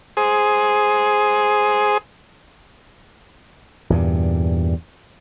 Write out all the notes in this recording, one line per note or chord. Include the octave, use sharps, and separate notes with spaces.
G#4 C5 D#6
E2 G2 A#2